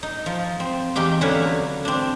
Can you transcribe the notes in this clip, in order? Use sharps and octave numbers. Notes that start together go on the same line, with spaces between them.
D#4
F3
C4
E2 D#4 G4 G5
D3 F#3 A#3 C#4 B4 C#5
C4 D4